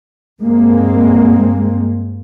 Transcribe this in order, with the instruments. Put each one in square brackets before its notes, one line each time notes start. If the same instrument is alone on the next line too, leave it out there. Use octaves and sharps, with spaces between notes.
[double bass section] G2 G#3 A#3 C4